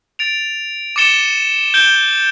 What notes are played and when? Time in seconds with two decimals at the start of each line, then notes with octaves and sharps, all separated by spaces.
0.19 A6 D7 F7
0.96 D6 A6 C#7 E7 G7
1.74 G6 D7 G7